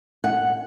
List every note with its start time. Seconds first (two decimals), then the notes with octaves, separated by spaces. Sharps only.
0.24 F#5